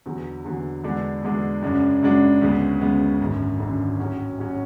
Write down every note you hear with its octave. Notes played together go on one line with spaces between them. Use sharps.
E2 D3 F#3
E2 D3 F#3
E2 D3 G#3 D4 F#4
E2 D3 G#3 D4 F#4
F#2 C#3 G#3 D4 F#4
F#2 C#3 G#3 D4 F#4
D2 C#3 G#3 B3
D2 C#3 G#3 B3
G#1 F#2 D3
G#1 F#2 D3
A2 F#3 C#4 F#4
A2 F#3 C#4 F#4